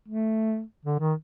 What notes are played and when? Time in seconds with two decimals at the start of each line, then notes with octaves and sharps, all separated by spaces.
0.08 A3
0.85 D3
0.99 D#3